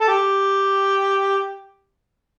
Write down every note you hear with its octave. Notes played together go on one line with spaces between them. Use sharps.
A4
G4